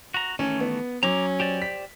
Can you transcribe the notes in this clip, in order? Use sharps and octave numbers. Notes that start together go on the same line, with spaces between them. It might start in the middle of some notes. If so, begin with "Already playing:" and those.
F#4 A#5
D#3 E3 A3 C#4
B3
F#3 C#4 A#5 D6
G4 C5 D5
B6